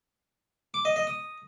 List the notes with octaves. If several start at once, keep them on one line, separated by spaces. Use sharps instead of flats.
D6
D#5
D#5
D#6